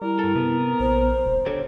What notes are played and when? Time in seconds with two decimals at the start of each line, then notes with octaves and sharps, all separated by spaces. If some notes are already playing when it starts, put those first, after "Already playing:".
0.02 G3 E4 A#4
0.19 G2 A4
0.36 C3 B3
0.80 A#1 C5
1.26 D#1
1.46 D3 G4 C#5